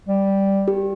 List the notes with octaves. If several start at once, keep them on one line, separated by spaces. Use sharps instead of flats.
G3
G4